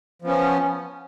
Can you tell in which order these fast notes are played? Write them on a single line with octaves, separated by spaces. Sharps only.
F3 B3 C#4